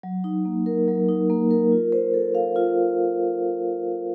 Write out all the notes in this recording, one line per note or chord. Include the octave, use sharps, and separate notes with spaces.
F#3
D#4
A#3
A#4
F#3
D#4
A#3
A#4
F4
C5
A4
F5
F4